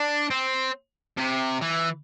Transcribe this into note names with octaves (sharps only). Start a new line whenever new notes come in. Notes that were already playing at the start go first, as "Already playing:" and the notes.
Already playing: D4
C4
C3
E3